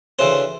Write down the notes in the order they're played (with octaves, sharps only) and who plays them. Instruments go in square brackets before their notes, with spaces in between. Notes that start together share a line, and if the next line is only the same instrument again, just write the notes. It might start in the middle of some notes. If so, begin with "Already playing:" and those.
[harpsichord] D2 C#3 E3 C5